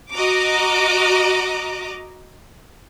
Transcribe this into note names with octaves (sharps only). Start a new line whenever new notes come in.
F#4 D#5 A#5 D6